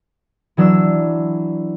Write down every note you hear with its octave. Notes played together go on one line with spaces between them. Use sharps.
E3 F#3 D4 E6